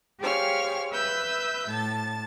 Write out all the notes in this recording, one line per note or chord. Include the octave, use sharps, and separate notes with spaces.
G4 G#4 C5 C#5 F5 F6
B4 E5 E6 G6
A2 A5 A6